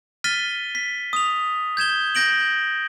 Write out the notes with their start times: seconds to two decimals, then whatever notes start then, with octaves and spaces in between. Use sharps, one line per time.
0.24 F6 A6 B6 D#7 G7
0.75 B6
1.13 D#6 F7
1.77 G6 G#6 E7 G7
2.15 G6 A#6 D7 F#7